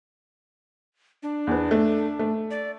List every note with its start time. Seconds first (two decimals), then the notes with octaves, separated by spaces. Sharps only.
1.23 D4
1.47 E2 B3
1.71 A3
2.19 A3
2.51 D5